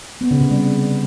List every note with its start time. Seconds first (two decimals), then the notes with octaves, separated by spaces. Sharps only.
0.21 B3
0.31 C#3
0.41 C3
0.51 G3